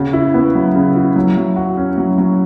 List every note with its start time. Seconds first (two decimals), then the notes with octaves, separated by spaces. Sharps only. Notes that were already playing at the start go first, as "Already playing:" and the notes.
Already playing: C#3 F#4
0.13 E4
0.34 B3
0.55 F#3
0.75 C#3
0.96 E4
1.16 F#3
1.37 F#3
1.56 F#4
1.77 C#4
1.98 F#3
2.18 F#3